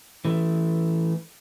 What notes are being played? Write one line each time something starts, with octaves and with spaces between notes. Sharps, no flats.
E3 A3